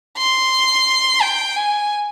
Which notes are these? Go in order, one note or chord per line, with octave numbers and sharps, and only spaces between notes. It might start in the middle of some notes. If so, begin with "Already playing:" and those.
C6
G5
G#5